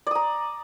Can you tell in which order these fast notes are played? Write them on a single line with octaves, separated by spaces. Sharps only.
D5 D#6 A#5